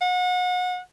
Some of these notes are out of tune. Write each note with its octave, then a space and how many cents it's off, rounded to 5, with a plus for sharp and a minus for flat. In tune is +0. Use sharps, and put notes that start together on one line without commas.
F#5 -35